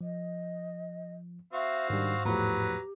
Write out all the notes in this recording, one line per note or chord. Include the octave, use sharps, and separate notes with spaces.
F3 D#5
C4 F#4 E5 F5
G#2 D#3 G3 D4
E2 A2 F3 F#3 G4 B4 A#5